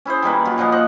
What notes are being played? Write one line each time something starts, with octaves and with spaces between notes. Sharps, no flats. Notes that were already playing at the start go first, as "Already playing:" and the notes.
C#4 E4 G#4 C5
D#3 G3 A#3 B4
F#3 F4
A#2 F3 D#5 F5
C5 D#5 F#5